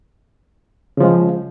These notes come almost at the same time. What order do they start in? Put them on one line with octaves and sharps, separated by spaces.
C#3 F3 G#3